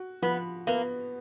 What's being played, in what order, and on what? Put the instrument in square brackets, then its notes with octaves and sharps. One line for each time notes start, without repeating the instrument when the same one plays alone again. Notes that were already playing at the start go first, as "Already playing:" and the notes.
Already playing: [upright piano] F#4
[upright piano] F3 [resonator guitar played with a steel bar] B3
[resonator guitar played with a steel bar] A#3 [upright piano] B3